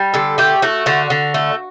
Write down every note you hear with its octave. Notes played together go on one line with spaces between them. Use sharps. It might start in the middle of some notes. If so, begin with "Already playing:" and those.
Already playing: G3
D3 A4
A3 G4
A3 F#4
D3 F#4
D3
A3